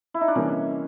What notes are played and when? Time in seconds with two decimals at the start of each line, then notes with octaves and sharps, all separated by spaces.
0.14 E4
0.21 D#4
0.28 D4
0.35 C3 E3 G3 A#3 C#4